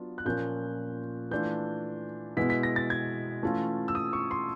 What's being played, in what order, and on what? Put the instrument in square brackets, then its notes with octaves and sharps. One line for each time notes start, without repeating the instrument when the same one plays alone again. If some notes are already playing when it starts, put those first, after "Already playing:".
Already playing: [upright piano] F#3 B3 D4 F4
F#6
A#2 F3 A#3 C#4 F4 G6
E3 A3 D4 F4 G6
B2 G#3 B3 E4 B6
B6
A#6
A6
G#6
E3 A3 C#4 F4
E6
D#6
C#6
C6